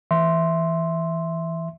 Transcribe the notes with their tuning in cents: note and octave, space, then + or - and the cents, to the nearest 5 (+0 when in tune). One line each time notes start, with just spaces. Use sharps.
E3 +0 E5 +0 C6 +0